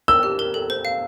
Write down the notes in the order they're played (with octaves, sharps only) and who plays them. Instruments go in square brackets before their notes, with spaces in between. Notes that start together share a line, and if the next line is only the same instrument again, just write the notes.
[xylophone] A#4 [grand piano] E6
[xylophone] G4
A#4
A4
C5
F5